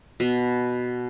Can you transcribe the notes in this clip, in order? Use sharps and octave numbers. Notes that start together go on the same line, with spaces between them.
B2